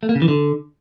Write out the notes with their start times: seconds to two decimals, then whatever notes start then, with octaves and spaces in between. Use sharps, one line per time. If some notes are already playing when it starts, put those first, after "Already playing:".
0.03 A3
0.09 A#3
0.15 C#3
0.22 E3
0.28 D3